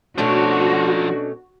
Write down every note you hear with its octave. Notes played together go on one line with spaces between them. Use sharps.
B2 F3 A3 C#4 D4 F#4 C#5